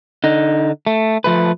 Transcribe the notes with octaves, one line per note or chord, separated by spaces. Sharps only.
D3 D#4
A3
F3 A3 B4